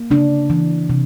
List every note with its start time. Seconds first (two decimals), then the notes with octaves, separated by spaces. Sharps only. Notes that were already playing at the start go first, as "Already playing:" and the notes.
Already playing: A#3
0.11 C#3 D4
0.50 E3
0.90 C3